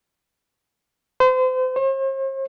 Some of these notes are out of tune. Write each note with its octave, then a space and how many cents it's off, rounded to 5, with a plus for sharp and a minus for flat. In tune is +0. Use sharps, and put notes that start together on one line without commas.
C5 -35
C5 +45